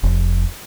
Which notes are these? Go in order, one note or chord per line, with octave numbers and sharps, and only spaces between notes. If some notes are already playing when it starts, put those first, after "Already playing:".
F1